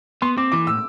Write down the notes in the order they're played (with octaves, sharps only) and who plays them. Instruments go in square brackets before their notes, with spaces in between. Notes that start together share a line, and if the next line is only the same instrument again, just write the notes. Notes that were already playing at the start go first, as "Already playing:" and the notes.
[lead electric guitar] B3 [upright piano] C6
[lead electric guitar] C4 [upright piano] D6
[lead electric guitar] E3 [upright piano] D6
[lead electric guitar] A2 [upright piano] E6